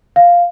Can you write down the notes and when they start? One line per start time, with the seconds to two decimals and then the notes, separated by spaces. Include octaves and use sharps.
0.16 F5